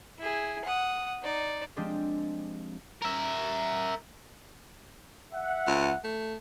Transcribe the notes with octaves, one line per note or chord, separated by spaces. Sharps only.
E4 G#4
F#5 D#6
D#4 D5
F3 G#3 C4 D4 G4 G#4
A#4 E5
E5 F#5
C#2
A3